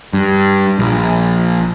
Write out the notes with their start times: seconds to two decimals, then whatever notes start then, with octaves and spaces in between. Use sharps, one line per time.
0.13 G2
0.79 A#1